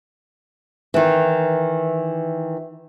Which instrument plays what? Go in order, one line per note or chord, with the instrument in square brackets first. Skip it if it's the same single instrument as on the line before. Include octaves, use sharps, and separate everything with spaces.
[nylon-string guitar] D#3 E3